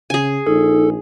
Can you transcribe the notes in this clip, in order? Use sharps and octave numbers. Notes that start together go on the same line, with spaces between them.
C#3 G#4 G#5
A#1 D#4 A4